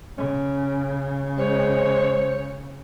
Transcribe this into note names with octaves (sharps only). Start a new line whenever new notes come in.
C#3 C#4
G#3 C5 C#5